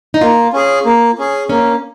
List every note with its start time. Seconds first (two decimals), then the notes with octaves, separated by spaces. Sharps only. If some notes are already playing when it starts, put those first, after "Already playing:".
0.14 D#4
0.21 A#3 F4
0.53 C#4 G#4
0.85 A#3
1.18 C#4 G#4
1.49 A#3 C#4